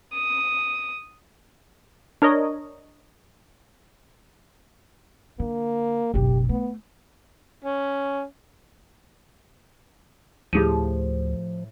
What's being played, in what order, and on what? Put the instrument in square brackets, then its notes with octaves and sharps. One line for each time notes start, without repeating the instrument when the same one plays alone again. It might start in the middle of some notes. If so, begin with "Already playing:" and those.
[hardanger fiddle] D#6
[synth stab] D4 A#4 C#5 D#5
[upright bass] D3 [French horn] A#3
[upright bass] F#1 B1 [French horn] G4
[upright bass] A3 [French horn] B3
[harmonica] C#4
[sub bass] D2 [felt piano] A2 E4 [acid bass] F3 [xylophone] G4 G#4 D#7